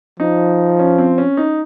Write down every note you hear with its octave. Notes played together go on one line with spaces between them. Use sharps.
F3 D#4
C#4
C4
C#4
D#4